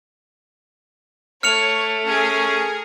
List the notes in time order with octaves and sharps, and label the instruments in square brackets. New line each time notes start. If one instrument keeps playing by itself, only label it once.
[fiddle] A3 [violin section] C#5 [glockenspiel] F6 C#7 F7
[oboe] C#4 [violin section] G#4 A#4